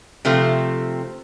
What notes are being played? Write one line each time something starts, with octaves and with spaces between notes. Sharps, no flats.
C3 F3 A3 C4